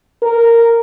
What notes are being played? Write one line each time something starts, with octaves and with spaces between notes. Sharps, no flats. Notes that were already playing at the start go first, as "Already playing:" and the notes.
A#4